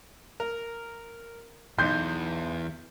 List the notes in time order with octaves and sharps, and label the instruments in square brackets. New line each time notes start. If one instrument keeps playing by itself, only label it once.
[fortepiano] A#4
[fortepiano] B1 D#4 C6 [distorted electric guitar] E2 [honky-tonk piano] G6